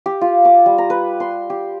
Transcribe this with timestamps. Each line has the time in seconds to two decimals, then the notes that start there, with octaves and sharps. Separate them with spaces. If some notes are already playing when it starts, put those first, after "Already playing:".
0.06 G4
0.21 F4
0.45 D6
0.66 G3
0.78 A#5
0.90 B4
1.20 C6
1.50 G4